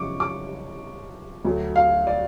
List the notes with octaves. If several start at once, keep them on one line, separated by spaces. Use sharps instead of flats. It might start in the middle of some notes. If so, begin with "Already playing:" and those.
Already playing: F#2 C#3 F3 G#3 C#6 D6
D6
D2 D3 F#3 A3
F5
D5